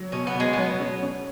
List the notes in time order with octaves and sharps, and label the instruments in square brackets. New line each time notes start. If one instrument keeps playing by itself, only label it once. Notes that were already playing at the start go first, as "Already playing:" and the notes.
Already playing: [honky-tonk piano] F#3
[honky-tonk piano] B2 [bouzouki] C#4
[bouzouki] B3
[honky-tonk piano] B2
[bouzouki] G#3
[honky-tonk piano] F#3 [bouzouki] B3
[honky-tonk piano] C#4
C#4